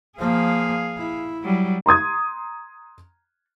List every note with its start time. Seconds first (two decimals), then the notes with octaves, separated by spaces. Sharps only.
0.19 F3 A#3 G#4 F5
0.97 E4
1.44 F#3 G3
1.86 A#5 C6 D#6 G#6